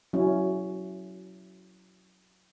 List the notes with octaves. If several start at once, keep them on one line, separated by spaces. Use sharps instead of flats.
F#3 C#4 E4